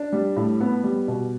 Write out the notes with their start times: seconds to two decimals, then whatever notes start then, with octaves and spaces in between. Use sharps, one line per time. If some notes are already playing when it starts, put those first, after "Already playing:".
Already playing: D4
0.12 G3
0.37 A2
0.60 B3
0.83 G3
1.08 B2